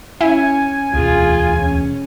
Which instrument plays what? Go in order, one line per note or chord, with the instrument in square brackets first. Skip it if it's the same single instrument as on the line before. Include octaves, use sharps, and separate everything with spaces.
[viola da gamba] C#4 [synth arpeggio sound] E4 [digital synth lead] G#5
[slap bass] E1 D2 [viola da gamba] F4 G#4
[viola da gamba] C#4